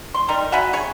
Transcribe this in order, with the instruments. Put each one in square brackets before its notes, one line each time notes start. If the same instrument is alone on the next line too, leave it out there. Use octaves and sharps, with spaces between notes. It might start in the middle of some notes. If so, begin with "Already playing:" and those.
[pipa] C6
G3 D#4 A#4
F#4 E5 G#5 B5
G#4 C#5 G#5